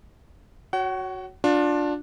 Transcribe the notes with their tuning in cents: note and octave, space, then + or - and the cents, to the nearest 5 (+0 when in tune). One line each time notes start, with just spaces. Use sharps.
F#4 +0 C#5 +0 F#5 +35
D4 +0 F4 +30